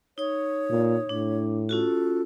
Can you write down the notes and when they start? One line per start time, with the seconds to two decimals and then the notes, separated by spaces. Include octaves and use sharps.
0.18 D#4 C#5 D#6
0.71 A#2
1.09 A2 D4
1.69 C#4 F4 F#4 A4